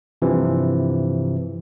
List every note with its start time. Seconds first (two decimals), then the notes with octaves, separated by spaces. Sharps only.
0.22 G2 C3 E3 F3